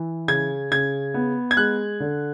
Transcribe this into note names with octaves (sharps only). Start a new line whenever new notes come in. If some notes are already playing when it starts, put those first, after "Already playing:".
Already playing: E3
C#3 G#6
C#3 G#6
B3
G#6
G#3 F#6
D3